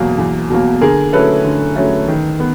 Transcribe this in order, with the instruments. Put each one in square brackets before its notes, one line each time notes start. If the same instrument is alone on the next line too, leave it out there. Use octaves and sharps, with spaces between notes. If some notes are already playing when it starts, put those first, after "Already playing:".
Already playing: [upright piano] E2 B2 F#3 A#3
E2
B2 F#3 A#3
D3 G#4 A#4
F#3 A3 C#4 E4 A4 B4
D3
F#3 A3 C#4 E4
D#3
B3